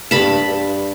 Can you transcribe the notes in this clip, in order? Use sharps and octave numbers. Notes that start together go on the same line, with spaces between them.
G2 A5 B5
G2